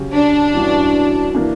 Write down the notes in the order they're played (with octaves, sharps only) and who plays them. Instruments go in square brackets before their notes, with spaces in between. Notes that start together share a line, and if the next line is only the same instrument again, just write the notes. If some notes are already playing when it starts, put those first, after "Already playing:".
Already playing: [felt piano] C#3 F#3 C#4 G4
[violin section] D4
[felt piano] G2 E3 G3 C#4 F#4
E3 A#3 D4